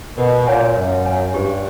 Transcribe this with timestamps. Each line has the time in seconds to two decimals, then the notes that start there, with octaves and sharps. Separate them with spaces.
0.18 B2 A#4
0.47 A#2 C#5 F5 G#5
0.76 F#2 A#4
1.05 C#5 F5 G#5
1.34 G2 G4